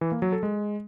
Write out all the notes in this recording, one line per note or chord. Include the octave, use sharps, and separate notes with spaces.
E3
A#3
F#3
A4
G#3